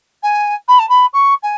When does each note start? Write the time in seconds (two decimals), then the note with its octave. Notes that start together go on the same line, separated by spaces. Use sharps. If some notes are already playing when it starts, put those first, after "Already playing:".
0.23 G#5
0.68 B5
0.79 A5
0.89 B5
1.13 C#6
1.42 G#5